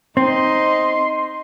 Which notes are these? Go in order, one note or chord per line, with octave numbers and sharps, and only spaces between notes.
C4 D#4 D#5 C6